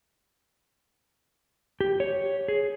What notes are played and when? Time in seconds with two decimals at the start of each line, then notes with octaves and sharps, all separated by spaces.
1.81 G4
2.00 C#5
2.48 G#4